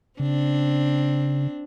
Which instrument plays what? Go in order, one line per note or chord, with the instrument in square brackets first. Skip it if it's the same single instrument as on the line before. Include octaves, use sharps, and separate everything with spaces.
[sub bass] C#3 [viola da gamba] C4 D4